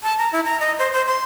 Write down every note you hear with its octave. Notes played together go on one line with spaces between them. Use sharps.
A5
A#5
E4
A#5
D#5
C5
C5
C6